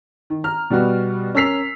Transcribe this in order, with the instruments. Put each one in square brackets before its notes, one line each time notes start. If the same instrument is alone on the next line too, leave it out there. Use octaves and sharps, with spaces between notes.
[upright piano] D#3
A#5 F6
B2 G3 B3 F#4
C#4 A#4 E6 B6 C7 F7